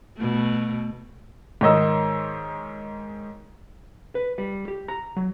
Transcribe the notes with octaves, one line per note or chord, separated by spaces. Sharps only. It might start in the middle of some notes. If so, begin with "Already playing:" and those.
B2 A3
G#2 D#3 C#5 D#5 E6
B4
G3
G4
A#5
F#3